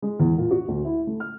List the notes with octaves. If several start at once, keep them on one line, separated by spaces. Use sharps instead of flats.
G#3
E2
A#2
F#4
D2
E4
A3
F6